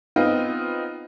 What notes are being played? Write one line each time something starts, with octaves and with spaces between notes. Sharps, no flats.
B3 C4 D#4 F4